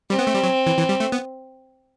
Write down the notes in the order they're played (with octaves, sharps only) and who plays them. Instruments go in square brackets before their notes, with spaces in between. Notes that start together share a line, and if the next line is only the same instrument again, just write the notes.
[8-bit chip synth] G3 [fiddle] C4
[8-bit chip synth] B3
A3
G3
F#3
E3
E3
G3
A3
B3